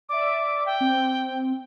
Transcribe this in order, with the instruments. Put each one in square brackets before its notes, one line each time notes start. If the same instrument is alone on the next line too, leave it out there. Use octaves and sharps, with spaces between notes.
[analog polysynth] D5 E5 [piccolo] D6
[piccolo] G5
[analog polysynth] C4